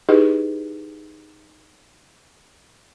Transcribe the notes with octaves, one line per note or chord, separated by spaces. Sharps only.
D#4 E4 G4 G#4 B4 D#5